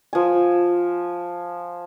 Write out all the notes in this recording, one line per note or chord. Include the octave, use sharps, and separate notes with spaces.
F3 G#5